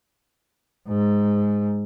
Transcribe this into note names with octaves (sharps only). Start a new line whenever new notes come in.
G#2